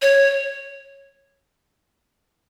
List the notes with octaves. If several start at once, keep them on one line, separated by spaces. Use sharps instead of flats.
C#5